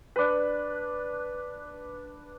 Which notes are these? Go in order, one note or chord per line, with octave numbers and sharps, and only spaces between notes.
D4 B4